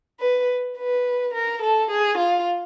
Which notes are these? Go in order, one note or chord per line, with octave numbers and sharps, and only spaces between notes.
B4
B4
A#4
A4
G#4
F4